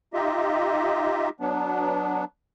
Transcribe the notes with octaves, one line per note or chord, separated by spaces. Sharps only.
D#4 F4 G4 D#5 E5
F#3 B3 D4